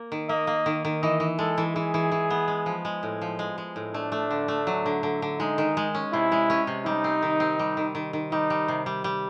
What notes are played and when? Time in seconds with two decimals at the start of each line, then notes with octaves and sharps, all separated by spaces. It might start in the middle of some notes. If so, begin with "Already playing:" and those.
Already playing: A#3
0.12 D#3
0.29 A#3 D#5
0.47 A#3
0.66 D#3
0.85 D#3
1.02 E3 D#5
1.20 E3
1.38 G#3 A4
1.58 E3
1.75 E3 G#4
1.94 E3
2.12 E3
2.30 B3
2.48 G#3
2.66 F3
2.85 G#3
3.03 A2
3.21 F3
3.39 G#3
3.58 G#3
3.76 A2
3.94 A3 D4
4.12 A3
4.31 D3
4.48 A3
4.67 F#3
4.86 D3
5.03 D3
5.22 D3
5.40 G#3 D#4
5.58 D#3
5.77 G#3
5.95 C#4
6.13 C3 E4
6.32 G#3
6.50 C#4
6.67 C3
6.86 G3 D#4
7.04 C4
7.22 D#3
7.40 C4
7.59 G3
7.77 D#3
7.95 D#3
8.13 D#3
8.32 G3 D#4
8.50 G3
8.68 C3
8.86 G3
9.04 G3